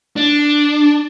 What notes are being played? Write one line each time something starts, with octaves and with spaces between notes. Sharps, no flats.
D4